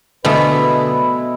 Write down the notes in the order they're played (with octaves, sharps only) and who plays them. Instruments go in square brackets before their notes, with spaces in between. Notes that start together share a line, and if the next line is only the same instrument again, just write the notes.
[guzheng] B2 A3 B3 [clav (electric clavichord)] D3 A5 [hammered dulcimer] G#3 E4 [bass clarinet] B4